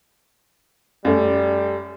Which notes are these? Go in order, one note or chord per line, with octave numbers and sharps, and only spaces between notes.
F#2 G3 A3